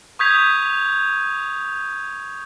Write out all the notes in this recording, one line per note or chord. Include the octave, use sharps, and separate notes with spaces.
C#6 D#6 G6 G#6 B6 F7